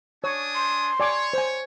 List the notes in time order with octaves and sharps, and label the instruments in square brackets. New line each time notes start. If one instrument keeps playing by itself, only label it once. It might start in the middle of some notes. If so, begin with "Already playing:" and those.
[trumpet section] D4 G#5 D#6 [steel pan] C#5
[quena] C6
[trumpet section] C#5 [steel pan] D5 G#5 D6
[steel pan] C5 G#5